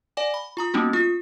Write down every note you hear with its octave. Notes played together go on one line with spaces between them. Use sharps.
D5 F#5 G#5 D6
B5
F4 A#5 D#6
G3 A#3 B3 C#4 D#4 F#4
F4 D#6